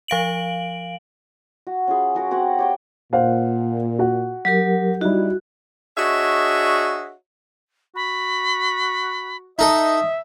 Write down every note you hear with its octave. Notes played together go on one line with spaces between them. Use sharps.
F3 F5 D7 F#7
F#4
C#4 F4 G#4 B5
F#3 F#4 A#4
C4 F#4 C#5 F#5
G4 C#5 G5
A#2 C5 F5 F#5
F#4 F#5
F#3 G4 A#4
G3 D#4 E4 F#4
D4 F#4 G#4 C#5 D#5 E5
F#4 B5
D#4 A4 D#5 E5